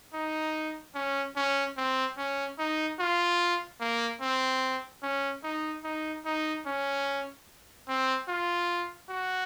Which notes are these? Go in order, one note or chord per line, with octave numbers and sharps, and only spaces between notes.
D#4
C#4
C#4
C4
C#4
D#4
F4
A#3
C4
C#4
D#4
D#4
D#4
C#4
C4
F4
F#4